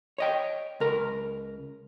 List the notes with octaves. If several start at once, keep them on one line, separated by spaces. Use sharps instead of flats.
C#5 D#5 G5
C#2 A#4